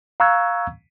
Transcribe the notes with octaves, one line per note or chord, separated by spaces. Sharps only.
F5 A#5 C#6 E6 F#6 G#6